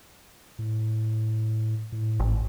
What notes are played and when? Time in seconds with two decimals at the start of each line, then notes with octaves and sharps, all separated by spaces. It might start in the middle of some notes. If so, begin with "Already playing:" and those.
0.59 A2
1.92 A2
2.20 G#1